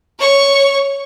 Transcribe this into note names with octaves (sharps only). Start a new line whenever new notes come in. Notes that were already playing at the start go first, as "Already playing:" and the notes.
C#5 C#6